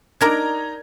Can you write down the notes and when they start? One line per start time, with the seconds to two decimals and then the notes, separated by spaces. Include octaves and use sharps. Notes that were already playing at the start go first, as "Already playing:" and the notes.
0.21 D4 D#4 A#4 D5 A#5 G#6